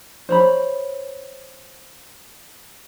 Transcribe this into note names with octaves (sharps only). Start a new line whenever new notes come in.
C5 C#5 B5